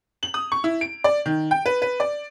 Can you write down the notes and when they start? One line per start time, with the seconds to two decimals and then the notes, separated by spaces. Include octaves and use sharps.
0.23 F#7
0.34 D#6
0.52 C#6
0.64 E4
0.81 D7
1.04 D5
1.26 D#3
1.51 G5
1.66 B4
1.82 B4
2.00 D5